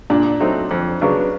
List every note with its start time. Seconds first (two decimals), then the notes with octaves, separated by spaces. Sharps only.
0.10 A#2 D4
0.40 F#3 A3 C4 D#4
0.71 F2
1.01 C#3 F#3 B3 D4